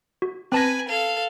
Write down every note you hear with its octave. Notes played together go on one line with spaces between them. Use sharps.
F#4
C4 B4 G#5 A5 A#6
A4 F5